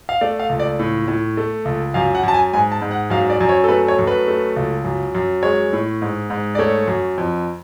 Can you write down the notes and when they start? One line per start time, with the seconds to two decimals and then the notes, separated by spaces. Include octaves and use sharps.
0.09 F5
0.21 A3 D5
0.39 F5
0.49 C#2
0.59 D5
0.79 A2
1.08 A2
1.37 A3
1.65 C#2
1.94 F#2 F5
2.15 F#5
2.23 F#2 A5
2.34 G#5
2.53 G#2 G#5
2.72 A5
2.82 G#2
2.91 F#5
3.10 F#2 F5
3.30 D5
3.40 F#2
3.49 C#5
3.64 A4
3.68 A3 B4
3.88 C#5
3.99 F#2
4.07 B4
4.28 A3
4.56 C#2
4.84 F#2
5.15 F#2
5.43 G#3 C#5
5.73 A2
6.02 G#2
6.30 G#2
6.55 D5
6.59 A3 C#5
6.88 F#2
7.18 F2